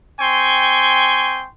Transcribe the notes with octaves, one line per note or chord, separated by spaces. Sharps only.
C4 G5 G#5 C6 C#6